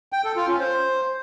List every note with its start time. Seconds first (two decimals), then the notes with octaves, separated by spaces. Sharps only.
0.13 G5
0.24 A4
0.36 F4
0.48 C#4
0.59 C5